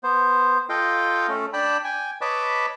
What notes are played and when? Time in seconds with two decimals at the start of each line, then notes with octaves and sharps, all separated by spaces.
0.03 B3 C5
0.69 F4 A4 D#5 F5 G5
1.28 A3 C#4 A4
1.53 D4 D5 G5 A5 B5
1.84 G5 G#5
2.21 B4 C#5 D#5 A5 B5 D6